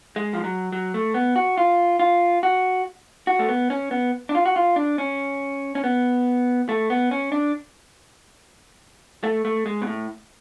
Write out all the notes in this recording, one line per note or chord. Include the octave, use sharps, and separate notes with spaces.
G#3
F3
F#3
F#3
A3
B3
F#4
F4
F4
F#4
F#4
A3
B3
C#4
B3
D4
F4
F#4
F4
D4
C#4
C#4
B3
A3
B3
C#4
D4
A3
A3
G#3
B2
A2